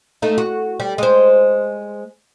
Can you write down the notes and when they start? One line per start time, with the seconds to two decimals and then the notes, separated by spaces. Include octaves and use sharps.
0.22 A3 D#4
0.38 F#4
0.80 G3
0.98 G#3 C5